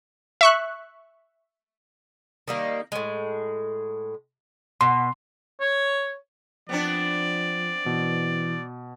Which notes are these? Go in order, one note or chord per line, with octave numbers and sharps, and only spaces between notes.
E5 C#6 F#6
D#3 G3 A#3
A2 G#3
B2 C6
C#5
F3 B3 C4 D4 D5
B2 E3